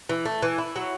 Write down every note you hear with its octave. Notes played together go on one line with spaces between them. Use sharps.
E3
A3
E3
E4
F#3